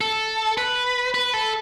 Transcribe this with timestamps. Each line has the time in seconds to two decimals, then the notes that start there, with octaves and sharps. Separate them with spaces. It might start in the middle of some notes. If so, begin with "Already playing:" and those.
0.01 A4
0.58 B4
1.15 B4
1.34 A4